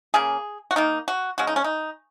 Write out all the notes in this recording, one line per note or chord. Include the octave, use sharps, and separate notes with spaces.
C#3 A#3 G#4
F#4
D#3 A#3 D#4
F#4
C#3 G#3 F#4
D#4
C#4
D#4